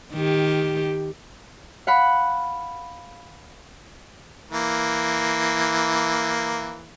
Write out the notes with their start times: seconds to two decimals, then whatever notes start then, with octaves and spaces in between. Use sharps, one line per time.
0.13 D#3 G4
1.87 F5 F#5 B5
4.51 E3 A#3